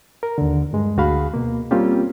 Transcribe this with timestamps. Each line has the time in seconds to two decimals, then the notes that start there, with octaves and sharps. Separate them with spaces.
0.23 A#4
0.38 D#2 D3
0.73 G2 G#3
0.97 D2 F#4 G#4 F5 B5
1.34 B2 A#3
1.71 G3 A#3 C4 C#4 F4 G4